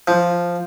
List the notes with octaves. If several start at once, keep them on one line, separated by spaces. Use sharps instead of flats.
F3